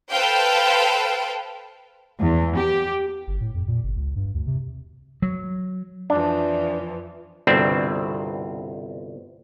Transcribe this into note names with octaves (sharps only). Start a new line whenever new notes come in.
A4 B4 C5 F5 G5
E2
G4
G1
A2
F2
A#2
G1
C#2
G2
D2
C3
F#3
F2 E3 F3 D4
G1 C2 B2 C4 D4